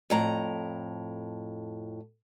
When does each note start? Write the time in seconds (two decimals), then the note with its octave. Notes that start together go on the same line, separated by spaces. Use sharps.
0.10 F2 A2 A#5